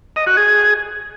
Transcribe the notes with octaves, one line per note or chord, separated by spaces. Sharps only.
D#5
F#4
G#4